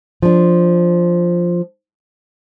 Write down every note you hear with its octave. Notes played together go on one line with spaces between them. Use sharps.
F3 D4